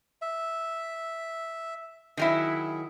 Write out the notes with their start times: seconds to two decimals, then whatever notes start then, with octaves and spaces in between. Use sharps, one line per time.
0.22 E5
2.17 D#3 F#3 E4 G#4